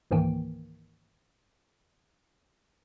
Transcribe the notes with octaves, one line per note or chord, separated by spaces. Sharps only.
C#2 G#2 D#3 E3 A#3 G5